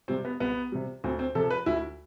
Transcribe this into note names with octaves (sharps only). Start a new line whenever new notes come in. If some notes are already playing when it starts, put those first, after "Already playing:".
C3 G3 C4
B3
C2 B3
C3 G3
D2 C4
C4
C3 F3 A4
B4
D2 E4